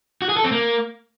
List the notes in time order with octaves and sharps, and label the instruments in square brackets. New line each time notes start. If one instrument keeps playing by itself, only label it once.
[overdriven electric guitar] F#4
G#4
A4
C4
A#3